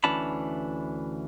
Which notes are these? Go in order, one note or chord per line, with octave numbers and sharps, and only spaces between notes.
D2 E3 C#4 D4 A5 B5